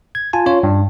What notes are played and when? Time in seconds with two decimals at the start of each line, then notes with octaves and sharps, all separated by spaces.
0.15 G#6
0.33 F4 G#5 A5
0.46 C#4 F4 C#5
0.63 G2